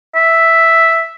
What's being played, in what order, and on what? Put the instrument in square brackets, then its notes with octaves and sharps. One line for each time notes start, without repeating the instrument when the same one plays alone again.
[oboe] E5